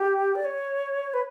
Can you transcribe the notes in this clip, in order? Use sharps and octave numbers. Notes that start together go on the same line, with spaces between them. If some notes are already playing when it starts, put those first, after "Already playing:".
Already playing: G4
D5
C#5
B4